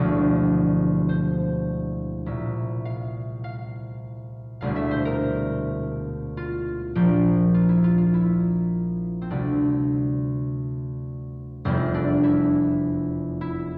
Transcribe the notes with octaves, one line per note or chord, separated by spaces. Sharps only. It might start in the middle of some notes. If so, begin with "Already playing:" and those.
Already playing: E1 D2 D3 F3
C5
C2 A#2 G3 E5
F5
F5
E1 D2 D3 G3 F5
E5
C5
A#4
F4
A#1 A#2 F3 G4
F4
E4
F4
F4
E4
C4
D2 C3 G3 D4
F1 E2 E3 G3 C4
D4
E4
E4